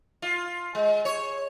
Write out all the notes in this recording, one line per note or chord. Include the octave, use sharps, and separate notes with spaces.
F4
G#3
C#5